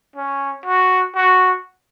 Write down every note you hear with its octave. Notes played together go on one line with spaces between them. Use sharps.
C#4
F#4
F#4